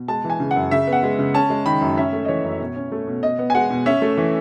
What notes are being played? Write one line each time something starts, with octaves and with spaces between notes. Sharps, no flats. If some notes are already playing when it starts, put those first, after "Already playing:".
Already playing: B2
G#3 A5
E3
G#5
C#3
F#5
F#2
C#3 E5
B3
F#5
G#3
C#3
C#4 A5
G#3
D#3 B5
F#2
C#4 E5
A3
D#5
E3 C#5
F#2
B2
C#4
A3
B2
B2 D#5
B3
G#5
G#3 F#5
B2
C#4 E5
A3
E3